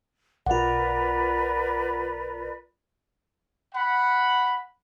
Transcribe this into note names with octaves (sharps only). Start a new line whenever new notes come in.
B1 F4 A#4 B4 D5 F#5
F#5 B5